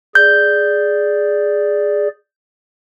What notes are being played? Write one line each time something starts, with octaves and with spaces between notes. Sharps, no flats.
G#4 D5 G6